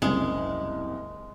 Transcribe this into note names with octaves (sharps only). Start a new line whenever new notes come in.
F#1 C2 G#3